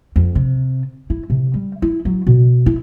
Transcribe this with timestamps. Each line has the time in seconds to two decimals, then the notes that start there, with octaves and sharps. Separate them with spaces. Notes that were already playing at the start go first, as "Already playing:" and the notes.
0.16 F2
0.35 C3
1.10 E4
1.30 C3
1.54 G3
1.82 E4
2.05 F#3
2.27 B2
2.66 E4